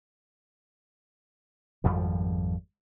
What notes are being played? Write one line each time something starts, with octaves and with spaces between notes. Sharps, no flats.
G#1 F2 F3 G3